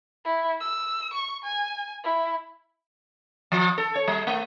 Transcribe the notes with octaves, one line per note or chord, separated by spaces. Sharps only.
E4
E6
C#6
G#5
E4
F3
A4
C#5
G3
A3